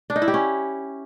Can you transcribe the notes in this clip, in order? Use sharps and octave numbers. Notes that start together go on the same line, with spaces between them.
D4
D#4
E4
G4
C#4